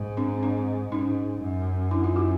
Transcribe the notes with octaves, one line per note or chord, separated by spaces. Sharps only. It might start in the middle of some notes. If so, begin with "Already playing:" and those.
Already playing: G#2
C4 D4
C4 D4
G#2 C#4 D#4
F#2
D4 E4
D#4 F4
E4 F#4